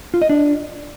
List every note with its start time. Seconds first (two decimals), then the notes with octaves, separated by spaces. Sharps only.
0.14 F4
0.22 D#5
0.29 D4